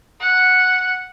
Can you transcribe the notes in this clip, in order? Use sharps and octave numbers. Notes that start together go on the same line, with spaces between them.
F#5